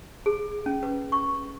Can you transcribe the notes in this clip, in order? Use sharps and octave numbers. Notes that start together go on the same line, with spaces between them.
G#4
C#4
B4
C#6